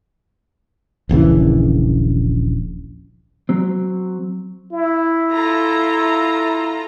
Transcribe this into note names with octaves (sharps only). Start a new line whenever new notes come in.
D#1 A#1 C#3 E3
F#3 C4
E4
F4 A4 A#5